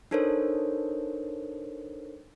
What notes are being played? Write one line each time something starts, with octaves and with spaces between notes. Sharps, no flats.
D4 D#4 A4 A#4 C5 C#5